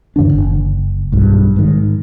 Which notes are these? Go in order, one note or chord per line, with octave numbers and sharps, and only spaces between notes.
F#2 D3 E3 D4
F#1
B1 G2
G#2 D#3